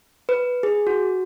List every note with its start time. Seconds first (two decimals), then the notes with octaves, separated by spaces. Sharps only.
0.29 B4
0.63 G#4
0.87 F#4